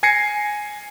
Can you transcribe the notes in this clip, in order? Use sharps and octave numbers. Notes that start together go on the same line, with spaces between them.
G#5 G#6 A#6 C7 C#7